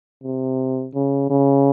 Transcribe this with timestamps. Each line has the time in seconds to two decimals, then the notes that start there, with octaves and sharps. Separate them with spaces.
0.24 C3
0.95 C#3
1.30 C#3